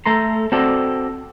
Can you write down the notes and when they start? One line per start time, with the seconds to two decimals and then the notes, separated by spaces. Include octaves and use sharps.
0.06 A3 A4 A#5 C6
0.52 C4 F#4 A4 D5